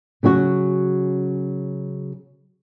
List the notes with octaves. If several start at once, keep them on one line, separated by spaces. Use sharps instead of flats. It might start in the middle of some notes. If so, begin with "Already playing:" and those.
C#3 F#3 C#4 F#4